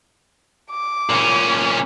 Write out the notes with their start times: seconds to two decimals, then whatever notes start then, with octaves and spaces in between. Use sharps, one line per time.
0.71 D6
1.09 A#2 C#4